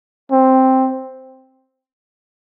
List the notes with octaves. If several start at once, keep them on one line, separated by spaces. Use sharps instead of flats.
C4